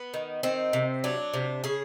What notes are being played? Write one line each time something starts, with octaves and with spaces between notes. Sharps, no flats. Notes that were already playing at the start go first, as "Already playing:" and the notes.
Already playing: B3
D#3
D#3 C4
C3
F#3 D4
C3
C#3 G#4